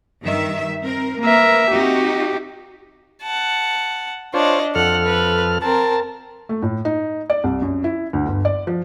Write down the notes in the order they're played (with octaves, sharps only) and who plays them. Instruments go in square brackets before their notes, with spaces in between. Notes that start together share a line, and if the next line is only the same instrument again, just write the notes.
[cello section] G2 D#3 E5
C4 A#4
[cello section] A#3 B4 [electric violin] A#4 E5
[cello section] C4 D#4 F#4 [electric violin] G4
[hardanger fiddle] F#5 A5
[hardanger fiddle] D4 D#5 [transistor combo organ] F4 C5 C#5
[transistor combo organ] F2 A4 F6 [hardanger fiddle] F#5
[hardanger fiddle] B4
[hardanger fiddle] C4 A#4 [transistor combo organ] A5
[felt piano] A3
A2
D#4
D5
C2
F#2
E4
D2
G1
D5
F3